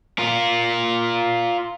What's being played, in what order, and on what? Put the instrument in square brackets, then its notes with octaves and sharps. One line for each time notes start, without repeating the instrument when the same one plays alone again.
[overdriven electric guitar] F4 A#4